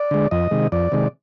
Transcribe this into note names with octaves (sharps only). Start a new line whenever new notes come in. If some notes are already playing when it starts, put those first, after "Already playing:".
Already playing: D5
D3 G#3
F2 D#5
C3 D#3 G#3
F2 D5
C3 D#3 G#3